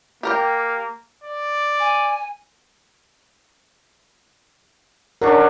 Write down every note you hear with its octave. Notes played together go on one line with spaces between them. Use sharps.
A#3 G4 A#4 G5
D5
G#5
F#3 C#4 D4 A#4